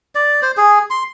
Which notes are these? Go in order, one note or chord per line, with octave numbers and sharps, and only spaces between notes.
D5
C5
G#4
C6